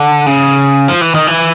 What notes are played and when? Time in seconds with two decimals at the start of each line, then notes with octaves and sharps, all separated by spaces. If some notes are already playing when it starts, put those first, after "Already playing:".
Already playing: D3
0.26 C#3
0.89 F3
1.01 E3
1.14 D#3
1.27 E3